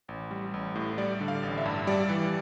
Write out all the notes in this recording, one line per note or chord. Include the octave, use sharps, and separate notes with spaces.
A1
G3
A1
A2
G3 D5
D3
F5
A1
E5
G2
G3 D5
E3